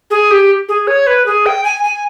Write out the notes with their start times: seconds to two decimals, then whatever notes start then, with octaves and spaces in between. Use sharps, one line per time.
0.10 G#4
0.31 G4
0.69 G#4
0.87 C#5
1.07 B4
1.26 G#4
1.46 G5
1.64 G#5
1.84 G#5